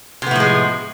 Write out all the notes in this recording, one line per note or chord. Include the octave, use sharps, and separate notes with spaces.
A2 C3 F3 G#3 B3